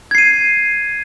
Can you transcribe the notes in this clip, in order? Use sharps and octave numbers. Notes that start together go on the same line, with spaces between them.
G#6 C7 D#7